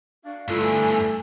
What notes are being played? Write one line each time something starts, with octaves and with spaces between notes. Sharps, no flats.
D4 F#4 F5
G2 D3 E3 G3 A3 F4
G#5